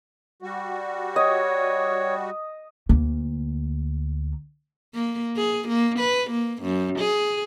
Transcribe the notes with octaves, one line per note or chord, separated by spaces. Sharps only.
G3 F#4
C#5 D#5
D2 A#3
A#3
G#4
A#3
B4
A#3
F#2
G#4